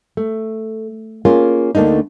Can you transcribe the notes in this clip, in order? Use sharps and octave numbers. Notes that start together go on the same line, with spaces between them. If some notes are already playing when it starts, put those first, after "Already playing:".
A3
A#3 C#4 F4 G#4 A#4
D2 A3 A#3 D4 D#4